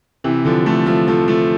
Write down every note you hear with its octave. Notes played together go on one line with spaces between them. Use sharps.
C3 E3
D3 F3
F3 A3
F3 A3
F3 A3
F3 A3